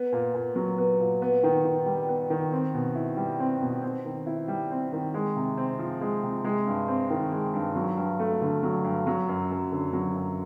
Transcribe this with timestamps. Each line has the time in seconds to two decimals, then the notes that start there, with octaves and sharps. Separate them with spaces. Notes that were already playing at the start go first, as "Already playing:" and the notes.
Already playing: B3
0.12 A#2
0.34 A#2
0.56 F#3
0.78 B3
1.00 A#2
1.22 B3
1.43 D#3
1.65 D#3
1.86 G3
2.09 B3
2.30 D#3
2.52 C4
2.74 B2
2.95 E4
3.17 G3
3.40 C4
3.62 B2
3.83 C4
4.05 D#3
4.26 E4
4.48 G3
4.71 C4
4.92 D#3
5.14 G#3
5.36 C3
5.58 C4
5.79 F3
6.01 G#3
6.23 C3
6.45 G#3
6.67 G2
6.88 C4
7.10 D#3
7.32 G#3
7.54 G2
7.76 F#3
7.97 G2
8.20 A3
8.41 D3
8.63 F#3
8.84 G2
9.07 F#3
9.28 F#2
9.51 F#2
9.72 D3
9.93 F#3
10.15 F#2